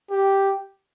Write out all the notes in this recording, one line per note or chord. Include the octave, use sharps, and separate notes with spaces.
G4